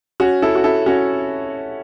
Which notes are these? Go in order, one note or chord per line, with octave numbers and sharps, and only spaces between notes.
C#4 F#4
E4 A4
F#4
E4 A4
C#4 F#4